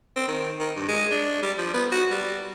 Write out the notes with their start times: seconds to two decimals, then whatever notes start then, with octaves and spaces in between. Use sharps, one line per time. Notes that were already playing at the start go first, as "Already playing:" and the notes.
0.16 C4
0.28 D#3
0.59 D#3
0.76 G2
0.88 G#3
1.11 D4
1.42 G3
1.58 F3
1.73 B3
1.91 F#4
2.11 G3